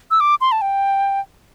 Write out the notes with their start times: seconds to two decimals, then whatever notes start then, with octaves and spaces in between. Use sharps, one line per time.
0.11 E6
0.20 D6
0.41 C6
0.52 A5
0.61 G5